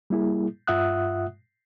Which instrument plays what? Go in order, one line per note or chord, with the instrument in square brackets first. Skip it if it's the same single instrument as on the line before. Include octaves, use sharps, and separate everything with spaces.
[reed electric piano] G3 A#3 E4 G#4
G2 F4 E5 F#5 D#6 F#6